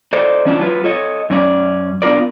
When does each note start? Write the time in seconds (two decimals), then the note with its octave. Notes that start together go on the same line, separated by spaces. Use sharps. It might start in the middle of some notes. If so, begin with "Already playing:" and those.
0.13 A4 C5 D5 D#5
0.45 E3 C#4 D4 F4
0.59 F#3 F4 B4
0.84 A4 C#5 D#5
1.30 F#2 C#4 D5
2.02 B3 D4 F4 A#4 D5